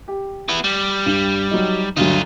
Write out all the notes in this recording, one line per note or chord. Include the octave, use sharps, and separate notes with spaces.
G4
B3 E4
G3
G2
F#3 D#4
D2 G2 F#3 D#4 F4